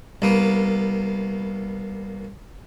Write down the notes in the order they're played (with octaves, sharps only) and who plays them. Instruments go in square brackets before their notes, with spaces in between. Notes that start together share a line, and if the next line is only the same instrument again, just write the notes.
[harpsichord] C2 A#3 B3